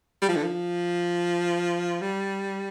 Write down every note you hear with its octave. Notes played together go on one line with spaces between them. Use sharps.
G3
F3
D3
F3
G3